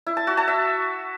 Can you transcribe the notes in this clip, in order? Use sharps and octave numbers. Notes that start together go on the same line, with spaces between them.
E4
A5
F#4
A5
E5